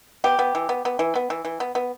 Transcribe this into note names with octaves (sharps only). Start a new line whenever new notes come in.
B3 G4
B3
E3
B3
B3
E3
B3
E3
E3
B3
B3